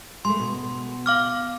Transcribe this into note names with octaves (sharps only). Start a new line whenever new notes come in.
G#3 A3 C6
B2
F5 D6 F6